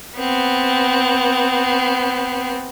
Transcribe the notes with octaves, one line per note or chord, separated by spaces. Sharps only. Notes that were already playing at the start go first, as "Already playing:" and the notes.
B3 C4